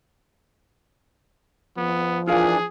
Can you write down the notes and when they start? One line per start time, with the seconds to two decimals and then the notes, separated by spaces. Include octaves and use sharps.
1.77 F3 B3
2.28 E3 D4 F4 G#4 A#4 F5